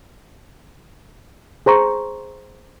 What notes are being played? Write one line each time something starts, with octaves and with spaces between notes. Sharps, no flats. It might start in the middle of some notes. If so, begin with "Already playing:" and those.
G#4 C5 A#5 C#6